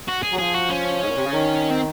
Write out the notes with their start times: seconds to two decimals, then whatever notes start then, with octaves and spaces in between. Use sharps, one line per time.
0.08 F#4
0.23 G#4
0.32 F#3
0.39 F3 G#4
0.55 F#4
0.70 C#4
1.02 G#2
1.09 A#2
1.17 C3
1.25 C#3
1.33 D#3
1.71 C4